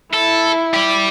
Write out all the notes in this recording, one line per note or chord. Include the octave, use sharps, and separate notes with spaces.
E4 A4
G4 D5